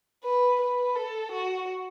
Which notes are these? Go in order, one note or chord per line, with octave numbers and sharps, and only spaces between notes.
B4
B4
A4
F#4